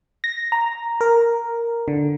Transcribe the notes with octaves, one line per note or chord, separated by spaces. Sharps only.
A#6
A#5
A#4
D3